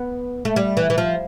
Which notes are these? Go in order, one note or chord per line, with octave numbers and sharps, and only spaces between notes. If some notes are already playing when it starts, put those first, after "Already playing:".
Already playing: B3
A3
G3
E3
E3
F3